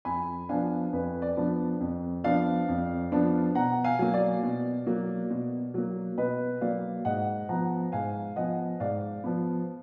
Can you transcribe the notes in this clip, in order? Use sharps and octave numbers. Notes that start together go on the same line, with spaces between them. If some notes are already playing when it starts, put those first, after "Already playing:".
F2 G#5 B5
F3 B3 D4 F5 G#5
F2 B4
D5
F3 B3 D4
F2
F3 B3 D4 D5 F5
F2
F3 B3 D4
B2 F#5 A#5
F5 G#5
F#3 A#3
D5
B2
F#3 A#3
B2
F#3 A#3
B2 B4 D#5
F#3 A#3 D5 F5
G#2 D#5 F#5
F3 B3 F#5 A#5
G#2 F5 G#5
F3 B3 D#5 F#5
G#2 D5 F5
F3 B3